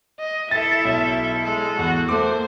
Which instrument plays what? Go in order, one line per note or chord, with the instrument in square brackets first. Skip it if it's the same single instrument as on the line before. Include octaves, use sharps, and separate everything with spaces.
[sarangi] D#5
[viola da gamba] E4 A4 [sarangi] E5 [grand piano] A6
[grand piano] B1
[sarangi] G#3 [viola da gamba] A4
[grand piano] E2 [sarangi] F#4
[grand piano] A3 D6 [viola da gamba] A#3 [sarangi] C5